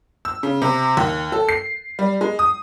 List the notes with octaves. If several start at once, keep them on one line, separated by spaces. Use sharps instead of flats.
E6
C#3
C3
D#2
A4
C7
G3
G#3
D#6